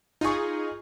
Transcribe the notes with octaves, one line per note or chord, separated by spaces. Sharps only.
D#4 F4 G#4 C#6